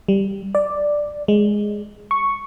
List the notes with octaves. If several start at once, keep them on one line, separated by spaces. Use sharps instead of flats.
G3
D5
G#3
C#6